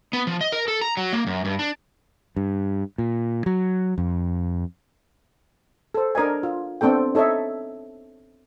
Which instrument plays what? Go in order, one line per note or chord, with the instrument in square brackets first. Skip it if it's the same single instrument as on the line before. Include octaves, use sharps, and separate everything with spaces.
[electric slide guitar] B3
F3
D#5
A#4
A4
A#5
F#3
A#3
F#2
G2
D4
[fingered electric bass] G2
A#2
F#3
F2
[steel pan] A4 C5
D4 A#4 D#5 G#5
F4
B3 C4 D4 A4 G5
D#4 A4 C#5 D#5 E5